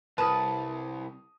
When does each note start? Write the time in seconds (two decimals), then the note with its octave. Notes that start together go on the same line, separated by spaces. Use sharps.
0.18 C2 B4 A5 A#5 D#6